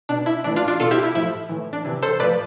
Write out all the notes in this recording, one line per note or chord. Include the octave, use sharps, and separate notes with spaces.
B2 D4
E4
A2 E3 D4
D4 F4
D4 F4
B2 F4 A4
E4 G4
E4
A2 F3 E4
A2 E3
D4
C3 E3
A4 C5
A2 F3 B4 D5